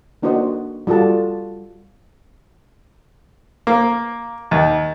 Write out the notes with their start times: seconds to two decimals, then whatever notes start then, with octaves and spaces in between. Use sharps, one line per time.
0.22 A#3 D4 D#4 F#4 C5 D#5
0.87 G3 F4 F#4 A4 A5
3.67 A#3
4.51 D#2